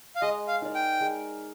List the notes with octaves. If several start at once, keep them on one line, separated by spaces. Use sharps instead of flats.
F5
G#3 D#5
F5
D#4 A#4 D5
G5
G#3